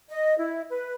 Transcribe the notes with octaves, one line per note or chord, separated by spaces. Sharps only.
D#5
E4
B4